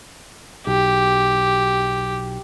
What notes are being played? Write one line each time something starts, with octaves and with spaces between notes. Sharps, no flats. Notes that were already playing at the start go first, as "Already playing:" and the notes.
B1 G4